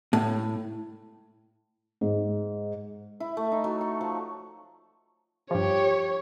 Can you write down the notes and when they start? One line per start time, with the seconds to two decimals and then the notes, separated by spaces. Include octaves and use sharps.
0.13 A2
2.01 G#2
3.20 E4
3.37 A3
3.52 D#4
3.64 F#3
3.81 C#6
4.01 F3
5.51 G2 F3 G4 C#5